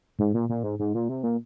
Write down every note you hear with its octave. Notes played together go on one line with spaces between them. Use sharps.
G#2
A#2
A#2
G#2
G#2
A#2
C3
A#2